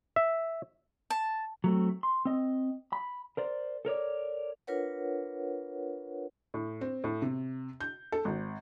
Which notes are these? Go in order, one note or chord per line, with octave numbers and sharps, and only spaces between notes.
E5
A5
F#3 A3 C4
C6
C4 D#5
B5
A#4 C5 D5
A4 A#4 C#5 D5
D4 F4 A#4 B4 C#5 F#5
A2
C4
A2
C3
G6
A4
G#1